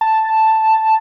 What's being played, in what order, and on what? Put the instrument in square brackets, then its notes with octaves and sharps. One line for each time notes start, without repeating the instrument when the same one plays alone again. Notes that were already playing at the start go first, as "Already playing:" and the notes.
[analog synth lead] A5